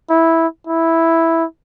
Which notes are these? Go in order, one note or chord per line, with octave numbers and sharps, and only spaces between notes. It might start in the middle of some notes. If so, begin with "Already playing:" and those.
E4
E4